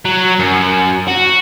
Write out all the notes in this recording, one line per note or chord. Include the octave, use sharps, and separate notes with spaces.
F#3
F#2
F#4